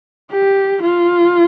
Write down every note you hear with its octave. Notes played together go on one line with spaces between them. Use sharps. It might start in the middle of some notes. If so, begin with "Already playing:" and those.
G4
F4